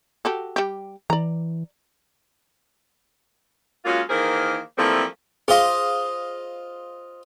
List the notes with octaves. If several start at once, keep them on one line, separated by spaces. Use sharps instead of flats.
F#4 G4 A4
G3 G4
E3 D5 A#5
F#3 G#3 A#3 C#4 F4
D#3 E3 A#3 G#4 A#4 C5
E3 F3 G3 A3 A#3 C4
F4 G#4 C5 D#5 F5